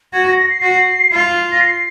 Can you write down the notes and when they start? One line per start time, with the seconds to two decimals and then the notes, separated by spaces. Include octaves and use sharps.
0.13 F#4 G#6
0.25 A#6
0.37 A#6
0.50 C7
0.62 F#4
1.12 F4
1.52 A#6
1.60 C7